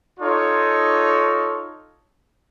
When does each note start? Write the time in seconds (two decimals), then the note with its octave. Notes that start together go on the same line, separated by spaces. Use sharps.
0.20 D#4 F4 A4 C#5